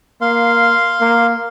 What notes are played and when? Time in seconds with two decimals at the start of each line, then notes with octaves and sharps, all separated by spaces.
0.21 A#3 F5 C6
1.00 A#3